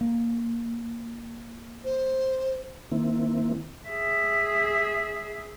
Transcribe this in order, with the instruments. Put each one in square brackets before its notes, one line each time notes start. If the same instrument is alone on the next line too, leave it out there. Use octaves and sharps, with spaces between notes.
[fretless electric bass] A#3
[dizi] C5
[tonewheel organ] D#3 A#3 C4 E4
[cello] G#4 E5